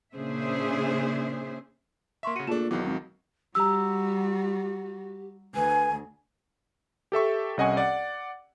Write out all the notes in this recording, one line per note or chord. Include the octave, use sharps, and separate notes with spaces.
A#2 C#3 D4 G#4 C5 E5
A#3 E5 C6 C#6 B6
C#3 F#4 C#7 D#7
A#2 A3 D4 G#4 A5 E7
B1 E2 D#3 F#3 D6
G#1
G3 F#4 G4 A#5 E6
D2 B4 G#5
G4 A4 E5 C#6
C2 C#4 D#5 F#5 G#5 C#6
D5 F#5